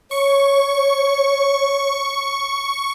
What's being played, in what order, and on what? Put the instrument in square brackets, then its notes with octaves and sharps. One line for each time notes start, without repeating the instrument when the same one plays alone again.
[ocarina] C#5 [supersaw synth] C#6